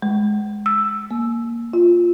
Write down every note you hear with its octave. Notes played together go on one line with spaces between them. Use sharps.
G#3
E6
A#3
F4